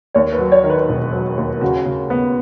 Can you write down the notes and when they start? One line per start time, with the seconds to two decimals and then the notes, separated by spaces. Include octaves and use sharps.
0.15 D#2 C#5
0.33 B4
0.39 F#3
0.52 C#5
0.64 D#3
0.70 B4
0.89 E1
1.13 F#3
1.37 D#2
1.61 C#3 F#4
1.86 C#3
2.10 B3